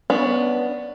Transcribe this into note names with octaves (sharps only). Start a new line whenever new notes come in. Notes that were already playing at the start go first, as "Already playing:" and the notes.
B3 C#4 D4